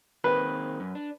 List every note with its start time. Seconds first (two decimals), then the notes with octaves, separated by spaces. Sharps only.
0.24 D#3 A#3 C4 B4
0.80 F#2
0.95 D4